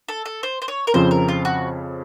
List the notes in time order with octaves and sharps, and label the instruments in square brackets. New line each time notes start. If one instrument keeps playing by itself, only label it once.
[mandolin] A4
A4
C5
C5
C#5
A#4
[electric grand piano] F2 C#3 F3 C4 [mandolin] C5
[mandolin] A#4
F4
F#4